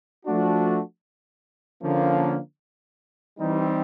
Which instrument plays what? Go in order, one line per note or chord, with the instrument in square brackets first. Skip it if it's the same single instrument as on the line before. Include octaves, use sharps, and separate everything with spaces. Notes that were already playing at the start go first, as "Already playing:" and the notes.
[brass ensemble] F3 A3 D4 F#4
D3 F3 A#3 C#4
E3 G3 C4 D#4